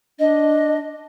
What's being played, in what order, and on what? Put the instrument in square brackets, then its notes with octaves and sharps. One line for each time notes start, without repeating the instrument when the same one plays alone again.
[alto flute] D4 [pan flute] D#5